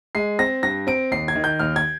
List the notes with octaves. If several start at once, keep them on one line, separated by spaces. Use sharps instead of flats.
G#3 C7
C4 A#6
G2 A#6
C4 D7
D#2 C7
G#6
D#3
G6
D#2 F6
G#6